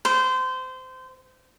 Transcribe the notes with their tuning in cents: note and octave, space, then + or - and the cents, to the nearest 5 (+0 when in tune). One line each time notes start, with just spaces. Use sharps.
C5 -25